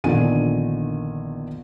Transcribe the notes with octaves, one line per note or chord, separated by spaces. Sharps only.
A#1 E2 D3 D#3 G#5 D#7